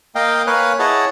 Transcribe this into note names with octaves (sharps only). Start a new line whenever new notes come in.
A#3 D#5 F5 G5
A#3 B4 C#5 F5 G#5 F#6
E4 G#4 C#5 D#5 F#5 A5